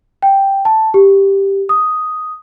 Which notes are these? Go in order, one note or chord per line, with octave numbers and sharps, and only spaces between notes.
G5
A5
G4
D#6